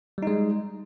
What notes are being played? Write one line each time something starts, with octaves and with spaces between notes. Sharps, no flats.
G3 G#3 D#4